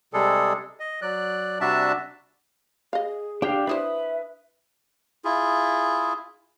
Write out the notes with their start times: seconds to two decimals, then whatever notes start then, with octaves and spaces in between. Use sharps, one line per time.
0.13 C3 G3 G#3 G#4 A4
0.80 D#5
1.02 F#3 D5 F#6
1.61 C3 G3 D4 F#4 E5 A5
2.93 G#4 D#5 F5
3.42 D3 D4 G4 F5 G5
3.67 D4 E4 B4 C5 E5 D#6
5.25 E4 F4 G#4